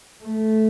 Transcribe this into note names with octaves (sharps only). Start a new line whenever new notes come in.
A3